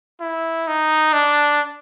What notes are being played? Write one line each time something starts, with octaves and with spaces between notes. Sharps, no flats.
E4
D#4
D4